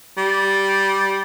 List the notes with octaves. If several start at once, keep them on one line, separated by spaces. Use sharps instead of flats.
G3